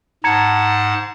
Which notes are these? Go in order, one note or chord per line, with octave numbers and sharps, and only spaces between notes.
G#2 F#5 A5 A#5 G#6 C#7